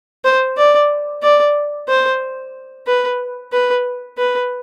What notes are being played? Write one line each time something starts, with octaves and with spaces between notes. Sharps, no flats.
C5
D5
D5
C5
B4
B4
B4